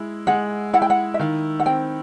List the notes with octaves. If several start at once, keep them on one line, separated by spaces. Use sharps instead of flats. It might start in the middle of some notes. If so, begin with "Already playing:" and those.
Already playing: G#3 E4
G#3 F#5
E4 F#5
G5
F#5
E5
D#3 F5
F#5
C4 G5